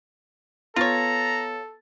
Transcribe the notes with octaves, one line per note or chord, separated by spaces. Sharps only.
B3 F4 A4 C#5 A#5 A6